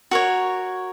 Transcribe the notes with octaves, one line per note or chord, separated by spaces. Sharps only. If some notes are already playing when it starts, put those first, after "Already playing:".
F#4 A#4 C#5